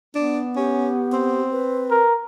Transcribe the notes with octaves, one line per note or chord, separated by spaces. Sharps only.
B3 D4
C#4 G4
C4
B4
A#4